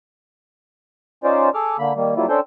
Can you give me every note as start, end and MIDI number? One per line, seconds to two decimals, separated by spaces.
1.24 1.49 61
1.24 1.49 63
1.24 1.49 65
1.24 1.49 72
1.24 1.49 74
1.54 1.77 68
1.54 1.77 69
1.54 1.77 86
1.54 1.77 89
1.79 1.93 50
1.79 1.93 58
1.79 1.93 83
1.96 2.14 51
1.96 2.14 55
1.96 2.14 58
2.16 2.26 54
2.16 2.26 55
2.16 2.26 58
2.16 2.26 64
2.16 2.26 65
2.29 2.40 61
2.29 2.40 62
2.29 2.40 69
2.29 2.40 72
2.29 2.40 79